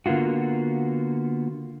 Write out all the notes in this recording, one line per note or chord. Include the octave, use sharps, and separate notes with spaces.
D3 A#3 B3 F4 F#4